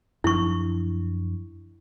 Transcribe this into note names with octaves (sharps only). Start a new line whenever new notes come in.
F#2 F3 D4 E4 C#6